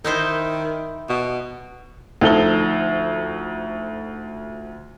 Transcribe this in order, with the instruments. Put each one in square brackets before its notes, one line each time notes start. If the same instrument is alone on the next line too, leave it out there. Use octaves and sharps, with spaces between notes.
[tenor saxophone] D#3 [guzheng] D#4 E4 C5
[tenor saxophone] B2
[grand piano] D2 F3 D#4 A4 E6 G7